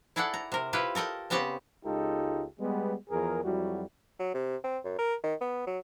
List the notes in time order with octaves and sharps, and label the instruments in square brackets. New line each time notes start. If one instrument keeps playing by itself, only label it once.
[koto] E4 G#4 A4 D5 F#5
A#5
C3 A#4
E4 F4 G4 B4
A4 A#4 D#5 G5
C#3 B3 C4 G4 F#5
[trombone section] C#2 G#3 D#4 F4 G4 A4
G3 G#3 B3
E2 F3 G#4 A#4
F2 F#3 G3 E4 F#4
[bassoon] F#3
C3
C4
F#2
A#4
D#3
B3
F#3